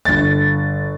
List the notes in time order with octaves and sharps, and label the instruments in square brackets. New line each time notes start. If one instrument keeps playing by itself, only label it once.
[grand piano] G1 A6